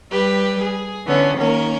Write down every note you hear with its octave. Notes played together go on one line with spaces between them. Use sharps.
G3 G4 B4
G#4
D3 E3 B3 C#4
D#3 A#3 C#4 A#4